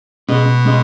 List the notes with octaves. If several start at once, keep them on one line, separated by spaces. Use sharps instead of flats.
B2 G#3 C#4 G#4 D#5
G#3 C#4 G#4 D#5